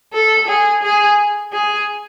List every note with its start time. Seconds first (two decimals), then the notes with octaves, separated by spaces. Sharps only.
0.13 A4
0.47 G#4
0.82 G#4
1.52 G#4